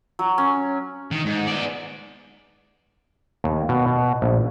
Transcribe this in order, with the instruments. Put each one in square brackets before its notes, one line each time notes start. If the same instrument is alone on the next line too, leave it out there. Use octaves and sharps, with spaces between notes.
[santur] F#3
C#4
[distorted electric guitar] D#3
G#2
B3 D5
[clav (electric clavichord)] D#2
B2
B2
A#1